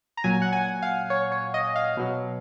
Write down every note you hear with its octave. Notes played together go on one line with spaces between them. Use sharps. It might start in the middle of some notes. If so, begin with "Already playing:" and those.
A#5
A#2 F#3 G#5
F#5
G#5
F5
C#5
C#5
D#5
F5
B2 F#3